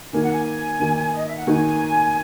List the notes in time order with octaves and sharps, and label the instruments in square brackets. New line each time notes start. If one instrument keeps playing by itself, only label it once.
[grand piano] D#3 A#3 D#4 F#4 [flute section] G#5
[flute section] F#5
G#5
[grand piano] D#3 A#3 D#4 F#4
[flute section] D#5
E5
F#5
[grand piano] D#3 A#3 D#4 F#4 [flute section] G#5